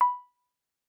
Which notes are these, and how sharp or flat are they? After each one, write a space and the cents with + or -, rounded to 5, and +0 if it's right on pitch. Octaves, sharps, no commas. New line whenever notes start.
B5 -5